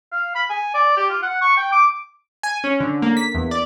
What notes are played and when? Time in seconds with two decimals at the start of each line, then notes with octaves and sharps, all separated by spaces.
0.12 F5
0.35 B5
0.50 G#5
0.74 D5
0.97 G4
1.10 F4
1.23 F#5
1.41 C#6
1.57 G5
1.72 D6
2.43 G#5
2.64 C#4
2.80 D3
3.02 A#3
3.17 B6
3.35 E2
3.51 D5